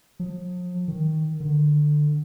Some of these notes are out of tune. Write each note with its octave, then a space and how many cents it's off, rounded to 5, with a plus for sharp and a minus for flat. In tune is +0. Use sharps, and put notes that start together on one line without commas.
F3 +40
D#3 +10
D3 +20